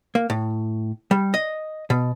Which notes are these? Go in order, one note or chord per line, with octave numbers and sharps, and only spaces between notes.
A#3
A2
G3
D#5
B2